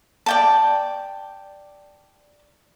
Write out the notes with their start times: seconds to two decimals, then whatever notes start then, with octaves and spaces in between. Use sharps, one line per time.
0.26 D5 G5 A5